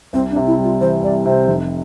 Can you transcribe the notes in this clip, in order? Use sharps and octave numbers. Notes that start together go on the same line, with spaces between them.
C2 C4
D4
C3
E4
G3
F4
E3 C5
C2 D5
C3 C5
F1